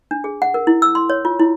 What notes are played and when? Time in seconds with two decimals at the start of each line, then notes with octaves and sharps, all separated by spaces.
0.11 D4
0.24 G#4
0.42 F#5
0.54 A#4
0.67 E4
0.82 E6
0.95 C6
1.10 C#5
1.25 F4
1.40 E4